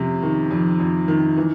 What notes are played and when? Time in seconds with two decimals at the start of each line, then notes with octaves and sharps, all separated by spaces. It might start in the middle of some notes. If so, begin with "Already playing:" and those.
Already playing: F2 C3
0.22 D#3
0.51 F2
0.80 F2
1.08 D#3
1.37 E3